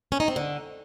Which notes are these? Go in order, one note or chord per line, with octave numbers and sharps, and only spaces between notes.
C#4
D#4
C4
D3